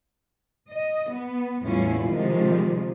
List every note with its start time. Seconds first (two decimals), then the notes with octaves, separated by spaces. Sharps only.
0.69 D#5
1.09 B3
1.62 E2 A2 G3 C#4 E4 F4
2.07 C3 D#3 F3 G#3